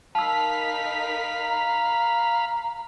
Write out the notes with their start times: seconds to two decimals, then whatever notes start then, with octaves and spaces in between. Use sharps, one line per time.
0.15 D#4 A#4 F5 A5 B5 E6 B6
1.41 A#5